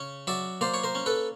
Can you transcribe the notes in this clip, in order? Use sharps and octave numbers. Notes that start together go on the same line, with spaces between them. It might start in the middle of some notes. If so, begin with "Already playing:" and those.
Already playing: C#3 C#4
F#3 D5 E5
A#3 C5 D5
C#5
A#4 C5
C#4
A4 B4